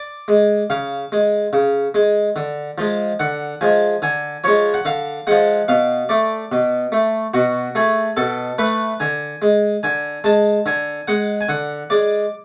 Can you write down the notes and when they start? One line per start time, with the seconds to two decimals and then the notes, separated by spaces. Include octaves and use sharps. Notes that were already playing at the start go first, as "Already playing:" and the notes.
Already playing: D5
0.28 G#3
0.70 C#3 F5
1.12 G#3
1.53 C#3
1.94 G#3
2.36 D3
2.78 F3 G#3
3.19 D3 F#5
3.61 F3 G#3 G#5
4.02 D3 G#5
4.44 F3 G#3 C#5
4.74 F#5
4.85 D3 F5
5.27 F3 G#3 F#5
5.68 B2 F5
6.09 A3 D5
6.52 B2
6.92 A3
7.34 B2 F#4
7.75 A3 G#4
8.17 B2 A4
8.58 A3 B4
9.00 D3 G#5
9.42 G#3
9.83 D3 G#5
10.24 G#3 A5
10.66 D3 G#5
11.08 G#3 F#5
11.41 G#5
11.49 D3 F#5
11.90 G#3 D5